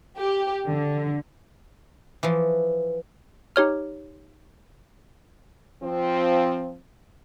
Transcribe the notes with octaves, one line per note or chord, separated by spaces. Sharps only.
G4
D3
E3 F3
D#4 G4 C#5 F6
F3 C4